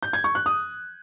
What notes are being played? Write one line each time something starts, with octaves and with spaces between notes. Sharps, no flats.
G6
G#6
C#6
F#6
D#6